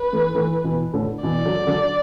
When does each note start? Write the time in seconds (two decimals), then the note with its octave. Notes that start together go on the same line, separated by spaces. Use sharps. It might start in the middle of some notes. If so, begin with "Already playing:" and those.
Already playing: B4
0.13 E3 A3
0.35 E3 A3
0.64 B2 E3
0.94 A2 D3
1.23 B2 E3 D5
1.45 D3 F#3
1.67 D3 F#3